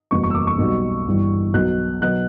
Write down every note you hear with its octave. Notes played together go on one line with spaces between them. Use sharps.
F#1 E2 B2 G3 C#6
C#6
E6
D6
C#6
B1 B2 G3
G1 G2 E3 G3
B1 B2 F#3 F#6
B2 F#3 F#6